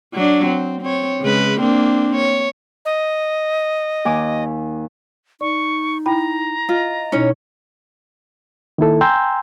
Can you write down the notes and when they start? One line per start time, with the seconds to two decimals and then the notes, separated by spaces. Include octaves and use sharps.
0.14 F#3 D4
0.46 C4
0.82 C4 C#5
1.21 C#3 G#3 B4
1.61 A#3 C4 D4
2.16 C#5
2.85 D#5
4.05 D#2 G#5 D6
5.41 D#4 D5 C#6
6.06 E4 G5 A#5 B5
6.69 F4 D#5
7.12 B2 C#4 D#4 E4 C#5
8.78 D#3 A#3 E4 A4
9.01 G5 G#5 A#5 C6 E6 G6